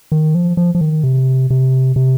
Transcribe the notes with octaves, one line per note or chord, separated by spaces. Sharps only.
D#3
F3
F3
F3
D#3
C3
C3
C3